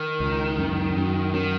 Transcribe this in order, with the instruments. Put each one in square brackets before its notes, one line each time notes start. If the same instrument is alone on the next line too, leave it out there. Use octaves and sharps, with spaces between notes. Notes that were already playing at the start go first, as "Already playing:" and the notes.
Already playing: [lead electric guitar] D#3
[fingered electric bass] C#2
F#2
F#2
[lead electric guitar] D#3 [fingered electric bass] F#3